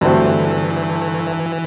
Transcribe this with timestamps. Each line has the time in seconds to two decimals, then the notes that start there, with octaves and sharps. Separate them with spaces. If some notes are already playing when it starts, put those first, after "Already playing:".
0.01 G2 D3 E3 F#3 A3 C4